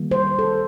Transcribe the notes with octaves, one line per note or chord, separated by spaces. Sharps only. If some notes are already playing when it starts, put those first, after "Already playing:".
Already playing: D#3 G3 A#3
C5
A4